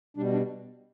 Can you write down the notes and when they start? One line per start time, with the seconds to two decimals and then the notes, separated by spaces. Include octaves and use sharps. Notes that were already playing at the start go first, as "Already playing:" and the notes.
0.17 B2 G3 D4
0.33 D4